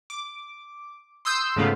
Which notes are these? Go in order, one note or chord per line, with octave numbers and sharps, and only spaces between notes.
D6
C6 D#6 E6 G6 C7
G#2 C#3 A3 B3 F4